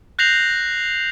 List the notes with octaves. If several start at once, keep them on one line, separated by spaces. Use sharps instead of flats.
F#6 G6 A#6 C7 F7 F#7